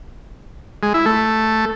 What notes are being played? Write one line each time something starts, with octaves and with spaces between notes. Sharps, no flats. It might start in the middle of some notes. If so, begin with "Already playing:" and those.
G#3
E4
A3